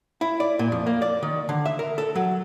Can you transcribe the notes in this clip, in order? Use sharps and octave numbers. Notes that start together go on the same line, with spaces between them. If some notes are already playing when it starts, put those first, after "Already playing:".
E4
D5
A#2
F2
A#3
D5
D#3
D3
E5
A#4
A4
F#3